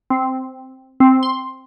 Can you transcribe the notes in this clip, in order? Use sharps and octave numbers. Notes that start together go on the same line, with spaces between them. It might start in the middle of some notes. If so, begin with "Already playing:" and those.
C4
C4
C6